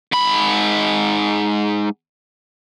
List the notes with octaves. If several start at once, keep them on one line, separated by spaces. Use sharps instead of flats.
G#2 B5